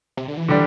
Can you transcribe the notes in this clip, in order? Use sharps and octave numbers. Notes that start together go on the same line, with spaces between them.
C3
D3
E3
D3 G3 D4